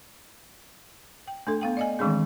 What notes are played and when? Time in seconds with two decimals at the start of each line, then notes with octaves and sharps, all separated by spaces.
1.27 G5
1.47 A3 D4 A4
1.61 B3 F5 G5
1.77 D5 D#5 G#5
1.99 D#3 E3 G#3 C4 D4 G#4